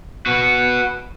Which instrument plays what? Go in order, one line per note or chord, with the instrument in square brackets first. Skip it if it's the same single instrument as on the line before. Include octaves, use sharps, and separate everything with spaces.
[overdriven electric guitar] F#4 B4